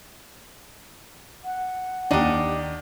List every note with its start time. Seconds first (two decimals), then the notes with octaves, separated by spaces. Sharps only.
1.44 F#5
2.11 D#2 D4 D#4 G4